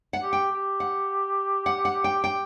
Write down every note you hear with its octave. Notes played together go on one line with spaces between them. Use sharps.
F#5
G4
G5
G4
F#5
F#5
F#5
G5
G5